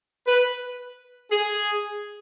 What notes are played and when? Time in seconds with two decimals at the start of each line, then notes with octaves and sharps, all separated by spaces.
0.27 B4
1.31 G#4